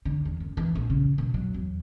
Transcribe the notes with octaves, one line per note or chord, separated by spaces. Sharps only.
D3
E2
F#1
E3
A#1
C#3
B2
F#3
E2